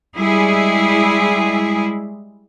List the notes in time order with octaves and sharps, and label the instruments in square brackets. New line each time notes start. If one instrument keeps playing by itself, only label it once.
[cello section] G3 G#3 E4 G#4